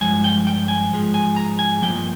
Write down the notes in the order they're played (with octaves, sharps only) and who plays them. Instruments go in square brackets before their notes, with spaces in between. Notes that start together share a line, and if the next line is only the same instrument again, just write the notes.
[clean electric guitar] G2 F3 G#3 G#5
G5
G5
G#5
G#2 F3 G#3
G#5
A#5
G#5
G2 F3 A#3 G5